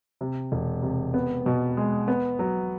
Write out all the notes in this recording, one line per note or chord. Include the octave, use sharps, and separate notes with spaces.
C3
E1
C3
B3
B2
G#3
B3
F#3